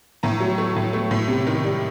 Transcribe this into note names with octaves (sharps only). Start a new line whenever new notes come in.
A2 A#5
F#3
A3
A2
A3
A2
C3
D#3
G3